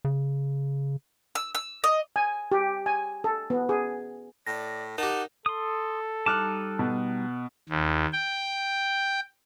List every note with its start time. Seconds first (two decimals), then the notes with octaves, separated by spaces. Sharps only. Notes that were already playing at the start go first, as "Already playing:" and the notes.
0.05 C#3
1.35 E6
1.55 E6
1.84 D#5
2.16 G#5
2.52 G4
2.86 G#5
3.24 A4
3.50 B3
3.69 G#4
4.47 A2 D5 A#6
4.98 D#4 G4 A#4 F#5 A5
5.46 A4 C6 D#6
6.26 G3 D#4 A5 D6 F6 F#6
6.79 B2
7.69 D#2
8.13 G5